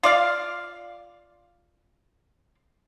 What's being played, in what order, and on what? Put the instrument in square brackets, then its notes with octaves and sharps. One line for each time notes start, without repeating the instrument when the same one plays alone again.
[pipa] F4 D5 F5